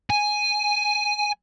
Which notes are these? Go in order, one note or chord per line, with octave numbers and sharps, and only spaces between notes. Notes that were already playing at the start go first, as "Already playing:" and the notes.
G#5